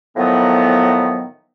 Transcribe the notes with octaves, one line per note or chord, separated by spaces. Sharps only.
A2 D#3 F3 F#3 B3